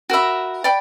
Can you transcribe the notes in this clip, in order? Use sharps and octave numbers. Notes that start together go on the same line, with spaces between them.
F#4 A#4 E5 B5
D5 G5 B5